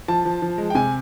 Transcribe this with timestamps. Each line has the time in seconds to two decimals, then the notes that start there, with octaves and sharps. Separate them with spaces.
0.08 F3 A5
0.25 F3
0.42 F3
0.58 G#3
0.70 G5
0.75 C3 G#5